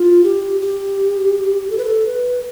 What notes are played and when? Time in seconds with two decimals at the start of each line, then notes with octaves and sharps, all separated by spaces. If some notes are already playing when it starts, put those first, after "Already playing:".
Already playing: F4
0.24 G4
0.61 G4
1.70 A4
1.78 B4
1.85 A4
2.07 B4